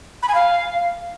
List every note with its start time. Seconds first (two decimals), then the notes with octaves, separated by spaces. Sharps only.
0.23 B5
0.29 G#5
0.35 F5